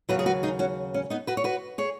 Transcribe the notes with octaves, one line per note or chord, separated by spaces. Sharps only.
D#2 C#3 F#3 F#4 B4
G#4
F#4 B4
D#4 G#4
C#4 F#4
C#4
B3 D#4
F#4 B4
C#5
F#4 B4
G#4 C#5